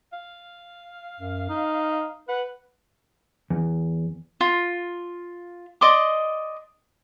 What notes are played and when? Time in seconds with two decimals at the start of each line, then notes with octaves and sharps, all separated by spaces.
0.13 F5
1.20 F#2
1.49 D#4
2.29 B4 F#5
3.50 E2
4.41 F4
5.81 D5 D#5 C6 D6